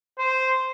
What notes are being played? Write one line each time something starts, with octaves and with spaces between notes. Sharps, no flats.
C5